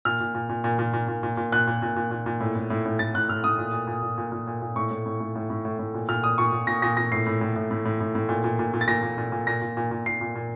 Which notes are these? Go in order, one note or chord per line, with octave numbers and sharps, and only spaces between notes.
A#2 F6
A#2
A#2
A#2
A#2
A#2
A#2
A#2
A#2
A#2
A#2 F#6
A#2
A#2
A#2
A#2
A#2
A2
A2
A2
A2
A2 A6
A2 F#6
A2 F6
A2 D#6
A#2
A#2
A#2
A#2
A#2
A#2
A#2
A#2
A2 C#6
A2
A2
A2
A2
A2
A2
A2
A#2
A#2 F6
A#2 D#6
A#2 C#6
A#2
A#2 A#6
A#2 A#6
A#2 A#6
A2 C7
A2
A2
A2
A2
A2
A2
A2
A#2
A#2
A#2
A#2
A6
A#2 A#6
A#2
A#2
A#2
A#2 A#6
A#2
A#2
A#2
A#2 C7
A#2
A#2